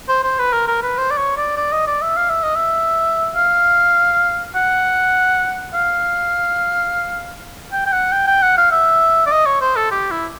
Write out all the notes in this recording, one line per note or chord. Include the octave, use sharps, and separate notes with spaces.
C5
C5
B4
A#4
A#4
B4
C5
D5
C#5
D5
D5
D#5
D5
E5
F5
E5
D#5
E5
F5
F#5
F5
G5
G5
F#5
G5
G5
F#5
F5
E5
D5
D#5
C#5
C5
A4
G4
E4